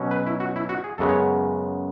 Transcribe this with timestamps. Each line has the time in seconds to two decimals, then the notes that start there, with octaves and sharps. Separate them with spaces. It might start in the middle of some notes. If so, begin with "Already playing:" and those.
Already playing: B2 F#3 C#4
0.11 B4
0.27 E4
0.40 F#4
0.56 E4
0.69 F#4
0.84 G#4
0.98 F#2 C#3 G#3 B3 A4
1.09 C#5